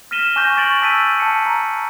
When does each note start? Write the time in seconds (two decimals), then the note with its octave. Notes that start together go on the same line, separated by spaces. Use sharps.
0.11 F6 A#6 B6 D#7 E7 G7
0.36 G#5 C#6 D6 F#6 G6 A#6
0.57 C#6 A6 D7 F#7
0.81 A5 E6 B6 D#7
1.20 A5 C#7
1.46 A#5